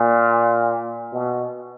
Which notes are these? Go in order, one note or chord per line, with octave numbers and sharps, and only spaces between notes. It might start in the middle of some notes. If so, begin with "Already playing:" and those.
Already playing: A#2
B2